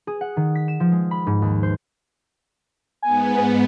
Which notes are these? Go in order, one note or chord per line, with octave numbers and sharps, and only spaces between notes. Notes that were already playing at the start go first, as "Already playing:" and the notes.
G#4
F#5
D#3
B6
E7
F3
G#3
B5
G#2
D#2
C5
G#2 B3 G#5